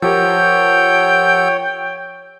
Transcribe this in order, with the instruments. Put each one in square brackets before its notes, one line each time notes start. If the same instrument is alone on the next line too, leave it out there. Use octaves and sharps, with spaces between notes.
[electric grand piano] F3 G4 A#4 [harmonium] C#5 [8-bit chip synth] F#5 E6 G6 [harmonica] G5